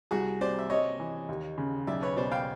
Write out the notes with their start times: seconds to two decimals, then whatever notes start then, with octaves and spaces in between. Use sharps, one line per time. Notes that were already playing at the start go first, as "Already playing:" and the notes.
0.11 C2 F#4 G#4
0.41 C3 C5 D5
0.59 E5
0.70 C3 C#5 D#5
1.00 E3
1.29 D#2
1.58 C#3
1.87 B1 D5 E5
2.02 B4 C#5
2.16 B2 C5 D5
2.31 F5 G5